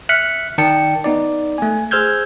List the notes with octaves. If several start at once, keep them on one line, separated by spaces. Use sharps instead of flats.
E5 F6 F#6 B6 C#7
D#3 D5 G5 A5 C#7
B3 D#4 D5
A3 G#5
G#4 C5 E6 F6 G6 G#6